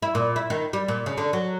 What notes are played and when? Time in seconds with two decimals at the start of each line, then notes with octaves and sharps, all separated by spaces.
0.02 E4
0.15 A#2
0.36 E4
0.50 D#3
0.73 G3
0.88 A#2
1.06 C#3
1.18 D3
1.33 F#3